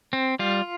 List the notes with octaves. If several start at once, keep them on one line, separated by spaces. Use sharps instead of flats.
C4
G3 F4